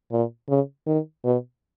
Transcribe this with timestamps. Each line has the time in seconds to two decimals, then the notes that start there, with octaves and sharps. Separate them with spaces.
0.11 A#2
0.48 C#3
0.87 D#3
1.24 B2